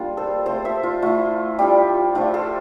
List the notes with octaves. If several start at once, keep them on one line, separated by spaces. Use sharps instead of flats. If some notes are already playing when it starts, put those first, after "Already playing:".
Already playing: G3 A#3 D4 F4
A4 C5
F3 A3 C4 A4 C5
C5 E5
F4
A3 E4 F4
G3 D4 F4 G4
F3 A3 D4 F4 A4
A4 C5